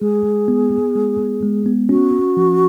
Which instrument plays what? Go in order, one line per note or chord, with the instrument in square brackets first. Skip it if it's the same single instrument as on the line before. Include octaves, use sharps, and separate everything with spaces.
[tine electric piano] G#3 [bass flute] G#4
[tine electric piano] G#3
B3
B3
G#3
B3
G#3
B3
[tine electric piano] C#4 [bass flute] F#4
[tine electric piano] C#4
F3